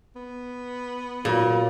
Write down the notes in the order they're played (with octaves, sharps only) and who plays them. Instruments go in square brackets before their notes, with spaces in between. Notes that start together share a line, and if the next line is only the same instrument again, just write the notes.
[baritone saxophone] B3
[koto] A#2 [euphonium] F#3 [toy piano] F4 G#4